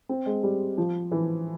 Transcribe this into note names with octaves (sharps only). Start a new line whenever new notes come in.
C4
G#3
G3
F3
E3